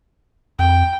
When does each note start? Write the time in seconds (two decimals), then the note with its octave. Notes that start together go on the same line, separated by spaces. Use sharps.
0.59 F2 G5